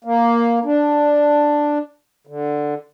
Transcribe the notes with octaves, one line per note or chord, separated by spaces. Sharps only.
A#3
D4
D3